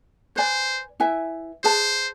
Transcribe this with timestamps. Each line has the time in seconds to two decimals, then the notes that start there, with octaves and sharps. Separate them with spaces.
0.36 B4 C5 D5 G#5
1.00 E4 B4 E5 G#5
1.64 G#4 B4 C5 D5 A5